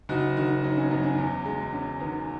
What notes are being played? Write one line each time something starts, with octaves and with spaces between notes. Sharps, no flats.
F#1 D#4 F#4
D#3 D#4 F#4
F#3 D#4
C#4
F#2 B3
C#4
E2
G#3
E2 C#4
D#3 B3